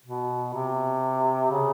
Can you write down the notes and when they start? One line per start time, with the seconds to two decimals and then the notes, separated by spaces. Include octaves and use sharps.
0.06 B2
0.54 C3
1.51 C#3